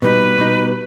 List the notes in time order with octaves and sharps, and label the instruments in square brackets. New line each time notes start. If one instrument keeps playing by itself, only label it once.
[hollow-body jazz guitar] B2 G3 D#4 [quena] B4
[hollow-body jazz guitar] B2 G3 D#4